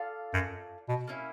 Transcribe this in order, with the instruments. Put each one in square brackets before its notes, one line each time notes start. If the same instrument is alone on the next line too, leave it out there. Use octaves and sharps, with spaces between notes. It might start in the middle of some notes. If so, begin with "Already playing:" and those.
Already playing: [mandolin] F4 A4 D5 F5
[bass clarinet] F#2
B2
[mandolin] A#3 C#4 E4